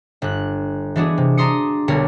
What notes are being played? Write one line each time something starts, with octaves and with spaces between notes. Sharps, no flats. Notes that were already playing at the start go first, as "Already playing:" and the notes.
G1 F#6
E3 G#3 B3 D4 F#4 G#4
C3
D4 A#5 C6 D#6 C#7
B1 D3 G3 B3 A#4 C#5